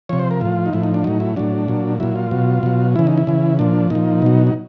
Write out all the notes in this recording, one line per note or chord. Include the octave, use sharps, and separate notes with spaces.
C3 F3 C#5
C5
A#4
A2 F3 F4
D#4
A2 F3 E4
D#4
D4
A2 F#3 D#4
E4
A2 F#3 D4
A#2 F#3
A#2 F#3 E4
F4
B2 F#3
B2 F#3
C#3 E3 E4
D#4
E4
C#3 E3
A#2 F3 D4
A#2 F3 D#4
B2 F#3
D#4